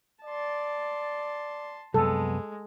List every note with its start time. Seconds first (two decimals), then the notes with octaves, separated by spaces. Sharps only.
0.25 D5 A5 C6
1.94 C2 F#2 G#3 B3 A4